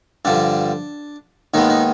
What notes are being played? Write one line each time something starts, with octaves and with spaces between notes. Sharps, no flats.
G2 D3 F3 D4
D#2 D#3 G#3 B3 D#4
D#4